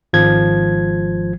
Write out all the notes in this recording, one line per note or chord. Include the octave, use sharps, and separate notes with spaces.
G#1 F3 G#6